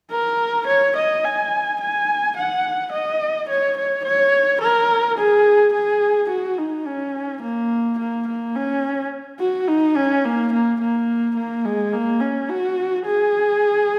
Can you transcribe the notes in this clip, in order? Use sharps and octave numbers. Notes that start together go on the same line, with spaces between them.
A#4
C#5
D#5
G#5
G#5
F#5
D#5
C#5
C#5
C#5
A#4
G#4
G#4
F#4
D#4
C#4
A#3
A#3
A#3
C#4
F#4
D#4
C#4
A#3
A#3
A#3
A#3
G#3
A#3
C#4
F#4
G#4